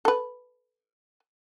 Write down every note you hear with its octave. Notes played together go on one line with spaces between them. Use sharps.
A4 B4